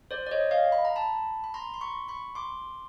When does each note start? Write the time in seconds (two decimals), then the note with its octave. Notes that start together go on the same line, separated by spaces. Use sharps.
0.11 C5 D5
0.27 D5
0.31 C#5 D#5
0.51 D#5 F5
0.72 B5
0.85 A#5
0.96 A5 B5
1.44 B5
1.54 A#5 C6
1.74 C6
1.81 B5 C#6
2.08 B5 C#6
2.35 C6 D6